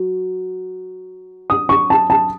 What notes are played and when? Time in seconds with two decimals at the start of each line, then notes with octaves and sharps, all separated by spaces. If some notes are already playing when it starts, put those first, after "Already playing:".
Already playing: F#3
1.50 D#6
1.69 C#6
1.90 A5
2.10 A5